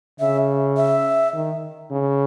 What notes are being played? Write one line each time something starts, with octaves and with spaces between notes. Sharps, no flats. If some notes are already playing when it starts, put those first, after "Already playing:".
C#3 E5
E5
D#3
C#3